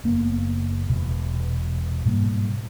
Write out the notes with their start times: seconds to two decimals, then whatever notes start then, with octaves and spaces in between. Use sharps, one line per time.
0.04 F#1 A#3 B3
0.89 E1 B2
2.05 G#2 B2 G3 A#3